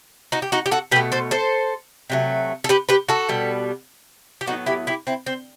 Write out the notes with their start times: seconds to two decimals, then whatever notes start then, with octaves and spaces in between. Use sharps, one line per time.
0.32 D#4 F#4
0.42 G4
0.52 D#4 F#4
0.66 G4
0.71 F#4 A4
0.91 B2 G4 B4
0.96 A3
1.12 A4 C5
1.31 A4 C5
2.10 C3 F#3 A3
2.64 A4
2.69 G4 B4
2.89 G4 B4
3.09 F#4 A4
3.29 B2 G3 B3
4.41 G4
4.46 A2 F#3 B3 D#4 F#4
4.66 E4 G4
4.87 E4 G4
5.07 C4 E4
5.26 C4